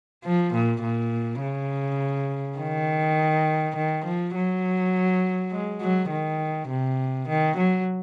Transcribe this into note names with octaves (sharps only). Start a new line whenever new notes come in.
F3
A#2
A#2
C#3
D#3
D#3
F3
F#3
G#3
F#3
D#3
C3
D#3
F#3